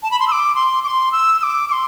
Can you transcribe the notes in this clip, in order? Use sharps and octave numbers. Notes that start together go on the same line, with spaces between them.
A5
B5
C6
E6
D6
C6
D6
C6
E6
E6
D6
D6
C6